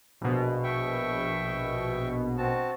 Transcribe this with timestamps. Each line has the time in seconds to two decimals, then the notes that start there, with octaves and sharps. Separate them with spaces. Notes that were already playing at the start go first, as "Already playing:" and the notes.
0.21 A#1 B2
0.63 E5 G5 C#6
2.38 C4 F#4 A5